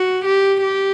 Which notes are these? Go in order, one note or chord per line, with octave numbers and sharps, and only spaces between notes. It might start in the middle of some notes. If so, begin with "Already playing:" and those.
Already playing: F#4
G4
G4